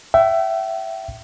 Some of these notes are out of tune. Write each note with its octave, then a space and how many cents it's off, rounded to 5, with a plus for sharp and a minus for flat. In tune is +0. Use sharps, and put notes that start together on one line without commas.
E5 +15 G5 -35